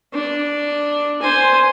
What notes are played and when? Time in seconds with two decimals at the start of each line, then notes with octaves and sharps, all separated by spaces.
0.13 D4
1.22 C5 G#5